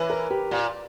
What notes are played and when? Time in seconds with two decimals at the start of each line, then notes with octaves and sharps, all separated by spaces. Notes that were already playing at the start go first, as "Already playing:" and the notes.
Already playing: E3 B4 C#5
0.10 A#4
0.30 G4
0.51 A#2 D5